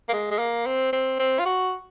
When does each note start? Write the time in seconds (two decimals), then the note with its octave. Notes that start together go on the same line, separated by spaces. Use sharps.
0.09 A#3
0.13 G#3
0.31 G#3
0.39 A#3
0.66 C4
0.93 C4
1.19 C4
1.39 F4
1.46 F#4